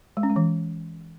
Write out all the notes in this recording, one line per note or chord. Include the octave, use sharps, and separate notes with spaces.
G#3
C#4
G#3
E3